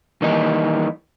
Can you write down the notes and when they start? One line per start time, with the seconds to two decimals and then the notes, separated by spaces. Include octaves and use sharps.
0.22 D#3 E3 G3 A#3 D#4